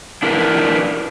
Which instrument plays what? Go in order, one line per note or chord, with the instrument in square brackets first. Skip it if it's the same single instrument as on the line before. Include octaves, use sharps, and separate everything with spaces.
[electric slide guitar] D4 E4 A#4 B4